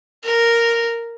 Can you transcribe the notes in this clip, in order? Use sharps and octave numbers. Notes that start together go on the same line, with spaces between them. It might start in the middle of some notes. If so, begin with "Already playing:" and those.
A#4